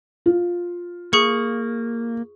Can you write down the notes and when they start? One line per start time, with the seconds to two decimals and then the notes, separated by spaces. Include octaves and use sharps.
0.26 F4
1.13 A#3 G#4 C#6 C#7